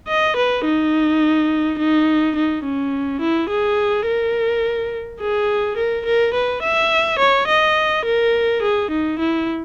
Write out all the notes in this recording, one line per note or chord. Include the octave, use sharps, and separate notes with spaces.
D#5
B4
D#4
D#4
D#4
C#4
E4
G#4
A#4
G#4
A#4
A#4
B4
E5
C#5
D#5
A#4
G#4
D#4
E4